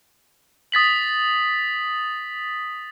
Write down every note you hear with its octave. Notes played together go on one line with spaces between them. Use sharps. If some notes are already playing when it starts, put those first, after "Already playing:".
D#6 A6 B6 F#7